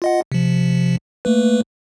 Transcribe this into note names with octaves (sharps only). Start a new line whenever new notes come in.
F4 D#5 F#5
C3 F3
A3 A#3 B4